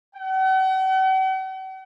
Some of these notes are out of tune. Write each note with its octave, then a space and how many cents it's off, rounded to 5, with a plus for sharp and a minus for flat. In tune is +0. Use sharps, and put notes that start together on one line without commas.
F#5 +45